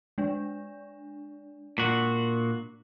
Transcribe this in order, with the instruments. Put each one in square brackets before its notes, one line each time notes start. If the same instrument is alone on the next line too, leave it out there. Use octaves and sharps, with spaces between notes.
[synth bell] G#3 D4
[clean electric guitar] A#2 F#4